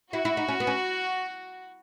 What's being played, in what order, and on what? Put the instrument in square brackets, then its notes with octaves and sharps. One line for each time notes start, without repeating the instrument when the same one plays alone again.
[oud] E4 [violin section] F#4
[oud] E4
D#4
C#4
B3
C#4